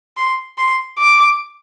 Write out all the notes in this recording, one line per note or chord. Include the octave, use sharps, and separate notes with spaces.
C6
C6
D6